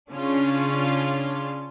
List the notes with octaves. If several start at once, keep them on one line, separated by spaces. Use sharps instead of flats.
C#3 C#4 D4 F4